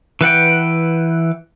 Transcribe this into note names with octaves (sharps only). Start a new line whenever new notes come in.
E3 B4 F#5 G5